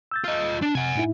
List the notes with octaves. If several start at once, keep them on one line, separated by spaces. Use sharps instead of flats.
E6 G6 A6
F4 D#5
D4
C3 F#5 G#5
A2 D#4 E4